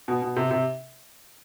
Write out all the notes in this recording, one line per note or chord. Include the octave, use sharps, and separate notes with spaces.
B2
B2
C3
C3